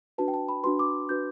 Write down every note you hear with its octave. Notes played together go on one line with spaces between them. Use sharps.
D4 F#4 B4 A5
G5
A5
B5
D4 F#4 B4 C6
D6
D4 F#4 B4 G6